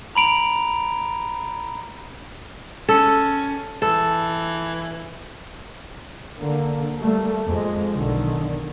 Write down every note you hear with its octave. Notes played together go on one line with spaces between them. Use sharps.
A#5 B5 D7 F7
C#4 A4
E3 A4
D3 A#3
G3 A3 A#3
F2 G#3
B1 D3 D#3